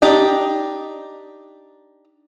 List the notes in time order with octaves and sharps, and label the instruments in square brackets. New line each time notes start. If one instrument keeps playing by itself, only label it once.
[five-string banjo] D4 D#4 G4 G5